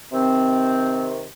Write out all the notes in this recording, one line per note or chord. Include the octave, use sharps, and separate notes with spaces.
C3 D#3 C4